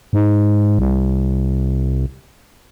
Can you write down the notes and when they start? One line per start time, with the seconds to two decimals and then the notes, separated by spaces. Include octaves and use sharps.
0.13 G#2
0.79 C2